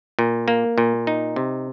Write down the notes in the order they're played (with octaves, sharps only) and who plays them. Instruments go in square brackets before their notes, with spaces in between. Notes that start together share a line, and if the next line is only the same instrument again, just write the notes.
[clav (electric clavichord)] A#2
A#3
A#2
D#4
C3